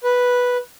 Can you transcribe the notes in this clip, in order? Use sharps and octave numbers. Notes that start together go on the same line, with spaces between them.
B4